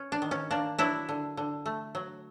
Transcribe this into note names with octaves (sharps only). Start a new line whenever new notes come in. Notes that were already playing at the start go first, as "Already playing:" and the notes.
Already playing: C#4
D4
D#3
C#4
A#3 D4
F#3 D4 E4
D3
D3
A3
F#3